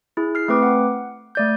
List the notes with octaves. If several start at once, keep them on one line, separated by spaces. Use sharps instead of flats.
E4 G#4
F6 C7
A3 C4 B4 D6
F#5
A3 D5 G6